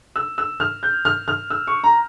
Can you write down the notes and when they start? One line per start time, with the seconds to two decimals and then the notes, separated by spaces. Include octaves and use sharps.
0.16 E6
0.38 E6
0.60 F6
0.83 G6
1.05 F6
1.28 F6
1.50 E6
1.67 C#6
1.84 A#5